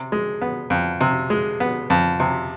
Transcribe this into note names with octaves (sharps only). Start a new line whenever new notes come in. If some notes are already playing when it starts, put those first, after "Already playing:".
Already playing: C3
G#3
B3
F2
C3
G#3
B3
F2
C3